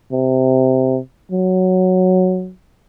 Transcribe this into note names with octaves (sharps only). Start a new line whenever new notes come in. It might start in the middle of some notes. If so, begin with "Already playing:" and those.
C3
F#3